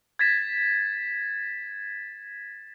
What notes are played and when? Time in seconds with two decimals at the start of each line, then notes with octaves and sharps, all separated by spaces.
0.19 G#6 A6 B6 E7